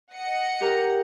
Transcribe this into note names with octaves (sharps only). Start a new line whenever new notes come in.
D#5 F#5 C#7
G4 A#4 A#5